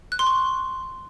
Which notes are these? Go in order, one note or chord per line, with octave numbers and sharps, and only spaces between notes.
F#6
C6
C#6